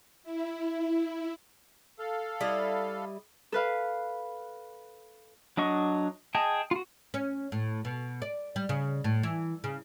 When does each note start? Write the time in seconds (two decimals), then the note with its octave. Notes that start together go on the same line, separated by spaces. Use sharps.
0.23 E4
1.99 A4 F5
2.41 G3 E4 D#5
3.52 A4 B4 F5
5.57 F#3 D4 D#5 C#6
6.35 G#4 D#5 G5 A5
6.71 F4 F#4
7.14 C#4
7.52 A2
7.85 B2
8.22 D5
8.56 G3
8.69 C#3
9.04 A2
9.23 E3
9.64 C#3